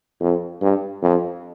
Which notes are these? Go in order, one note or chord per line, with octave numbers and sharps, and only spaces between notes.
F2
G2
F2